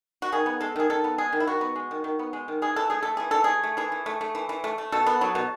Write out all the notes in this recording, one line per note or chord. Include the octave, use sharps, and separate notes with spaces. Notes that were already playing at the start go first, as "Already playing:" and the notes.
F#4
D#3 G#4
B3
G#3 A4
D#3 G#4
D#3 A4
B3
G#3 G#4
D#3
E4
D#3 F#4
B3
G#3
D#3
D#3
B3
G#3
D#3
E3 G#4
E3 A4
A3 G#4
A3 A4
E3 G#4
E3 A4
A3 G#4
A3
E3 G#4
E3
A3
A3
E3
E3
A3
A3
B2 A4
B3
F#3
B2